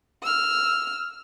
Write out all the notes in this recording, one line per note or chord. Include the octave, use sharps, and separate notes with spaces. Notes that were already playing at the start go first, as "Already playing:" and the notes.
E6 F6